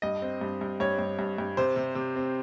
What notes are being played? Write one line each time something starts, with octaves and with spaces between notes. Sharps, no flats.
G2 D#5
C4
G2
G2
G2 C#5
G2
G2
G2
C3 C5
C3
C3
C4